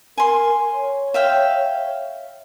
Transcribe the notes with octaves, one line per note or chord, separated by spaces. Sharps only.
A#4 G#5 C6
C#5
E5 F5 G5